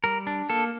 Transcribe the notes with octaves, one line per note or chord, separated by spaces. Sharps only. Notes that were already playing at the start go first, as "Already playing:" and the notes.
G3 A#4
D4
A#3 A4